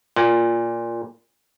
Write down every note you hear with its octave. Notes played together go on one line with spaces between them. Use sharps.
A#2